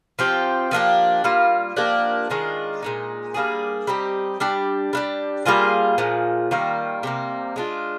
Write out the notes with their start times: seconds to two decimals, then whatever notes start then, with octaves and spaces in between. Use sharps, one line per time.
0.19 F3 C4 G4
0.71 F3 A#3 D4 G4
1.24 G3 A#3 F4
1.76 F3 A#3 D4 G4
2.29 D#3 G#3 D4 F4
2.82 A#2 G#3 D#4
3.34 G3 A#3 D4 G#4
3.87 G3 C4 D#4 G4
4.40 G3 D4 G4
4.93 G3 D4 G4
5.45 G3 A#3 F4 G#4
5.98 A#2 F3 G#3
6.51 D#3 G3 A#3 F4
7.03 C3 G3 A#3
7.56 G#3 D4 F4